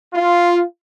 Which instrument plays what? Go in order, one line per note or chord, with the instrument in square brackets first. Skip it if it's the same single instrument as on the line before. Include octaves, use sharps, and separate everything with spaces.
[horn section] F4